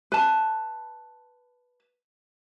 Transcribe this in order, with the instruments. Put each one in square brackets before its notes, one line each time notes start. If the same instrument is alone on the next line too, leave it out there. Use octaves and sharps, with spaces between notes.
[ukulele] B4 A5